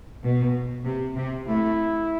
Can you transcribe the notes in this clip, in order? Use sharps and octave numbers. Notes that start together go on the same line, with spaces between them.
B2
C3
C3
A3 E4